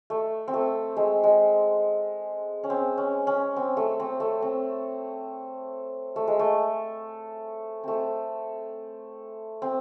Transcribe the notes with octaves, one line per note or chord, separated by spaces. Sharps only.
A3
C4
A3
G#3
G#3
C#4
C4
C#4
C#4
C4
A3
C4
A3
C4
A3
G#3
A3
A3 C4
C4